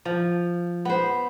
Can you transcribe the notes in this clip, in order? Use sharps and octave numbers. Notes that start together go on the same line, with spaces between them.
F3
B3 C5